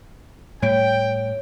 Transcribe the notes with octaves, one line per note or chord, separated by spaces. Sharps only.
A2 G3 C#5 G5 D7